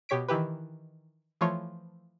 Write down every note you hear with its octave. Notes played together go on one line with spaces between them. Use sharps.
B2 G4 C#5 B6 D7
D#3 E3 E4 G4 B4
E3 F3 A3 F4 C#5